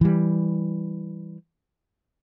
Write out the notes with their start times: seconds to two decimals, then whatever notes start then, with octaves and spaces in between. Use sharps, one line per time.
0.01 E3 G3